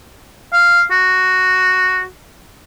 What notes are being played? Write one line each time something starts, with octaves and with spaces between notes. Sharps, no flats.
F5
F#4